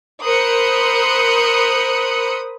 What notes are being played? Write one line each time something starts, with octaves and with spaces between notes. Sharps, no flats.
A#4 C5 B5 D#6 F#6 C#7